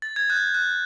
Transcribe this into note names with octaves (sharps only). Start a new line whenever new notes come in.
A6
G#6
F#6 G6
F#6